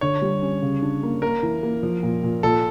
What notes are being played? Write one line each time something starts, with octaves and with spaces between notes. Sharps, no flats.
D3 C#5
G3
C#4
C#3
D4
A#3
A#3 A#4
E3
A#3
F3
A#2
A#2
A#2 A4